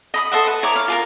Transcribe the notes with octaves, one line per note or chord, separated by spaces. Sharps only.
D#5 B5 D#6
A4 C5 E5 F#5
B4
E4 C#5 A#5 D6
F5
F4 G#4 A#4